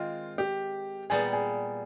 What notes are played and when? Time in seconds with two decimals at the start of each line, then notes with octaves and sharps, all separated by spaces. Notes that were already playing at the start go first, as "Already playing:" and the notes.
Already playing: D#3 G#3 C4 F4
0.38 G4
1.10 A#2 G3 B3 G#4
1.33 G#4